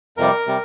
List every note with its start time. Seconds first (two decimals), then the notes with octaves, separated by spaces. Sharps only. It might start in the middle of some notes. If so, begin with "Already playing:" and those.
0.17 F2 C3 G3 A#4
0.47 C3 G3